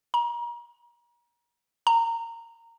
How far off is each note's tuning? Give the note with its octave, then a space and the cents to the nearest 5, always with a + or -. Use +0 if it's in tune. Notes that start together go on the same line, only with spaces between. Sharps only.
A#5 +35
A#5 -20